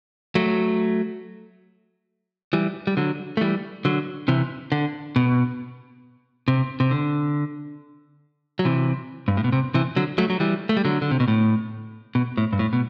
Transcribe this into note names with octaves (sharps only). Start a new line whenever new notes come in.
F#3 A3
E3 G3
G3
D3 F#3
A3
E3 G3
D3 F#3
C3 E3
D3
B2
C3
C3
D3
F#3
C3 E3
G2
A2
B2
C3
C3 E3
D3 F#3
F#3 A3
F#3
E3 G3
A3
G3
D3 F#3
D3
C3
B2
A2
B2
A2
G2
A2
B2